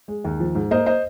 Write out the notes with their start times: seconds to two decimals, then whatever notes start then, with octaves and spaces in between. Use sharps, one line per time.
0.08 G#3
0.24 D#2
0.40 F3
0.55 G#2
0.71 A#3 C5 D#5
0.86 C5 D#5